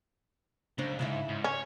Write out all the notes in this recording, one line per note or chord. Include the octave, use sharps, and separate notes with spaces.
C#2 F#2 D4 C5
G#2 C#3 E4 E5
G#2
C#4 C#5